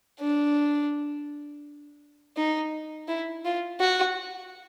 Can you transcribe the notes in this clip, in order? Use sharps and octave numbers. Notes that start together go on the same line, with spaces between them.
D4
D#4
E4
F4
F#4